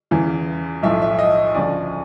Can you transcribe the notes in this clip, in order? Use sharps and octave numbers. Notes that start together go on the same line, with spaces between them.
E2 C#3 E3
B1 A2 F3 E5
E5
D#5
D2 C#3 F3 D5